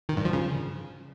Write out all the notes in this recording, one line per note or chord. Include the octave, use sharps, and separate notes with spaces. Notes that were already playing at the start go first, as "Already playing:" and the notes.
D#3
G2
F3
C#3